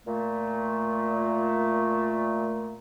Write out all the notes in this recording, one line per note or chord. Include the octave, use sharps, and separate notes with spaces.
A#2 A3